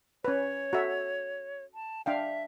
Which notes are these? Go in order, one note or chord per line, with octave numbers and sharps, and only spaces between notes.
C#4 B4 C#5
F#4 A4 E5
A5
D4 E5 F5 G5